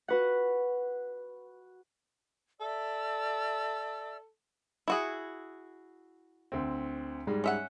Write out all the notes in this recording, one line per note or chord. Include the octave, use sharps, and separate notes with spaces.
F#4 B4 F#5
A4 D5 E5 E6
E4 F#4 G#4
D2 C4
G#2 G3 G#3
C#4 E5 F#5